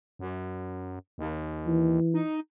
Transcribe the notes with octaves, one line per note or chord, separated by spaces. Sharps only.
F#2
D#2
E3
D#4